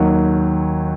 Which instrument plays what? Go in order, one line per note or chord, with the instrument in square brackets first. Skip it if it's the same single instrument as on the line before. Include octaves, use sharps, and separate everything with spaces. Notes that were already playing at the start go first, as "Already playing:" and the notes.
Already playing: [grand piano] D#2 D#3 F#3